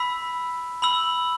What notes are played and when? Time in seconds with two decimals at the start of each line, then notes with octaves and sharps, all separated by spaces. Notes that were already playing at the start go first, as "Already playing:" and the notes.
Already playing: B5 E6 B6
0.82 B5 E6 F#7